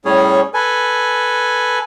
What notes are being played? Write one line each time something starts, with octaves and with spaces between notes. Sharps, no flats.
A2 G3 C#4 G#4 C#5
A4 B4 G#5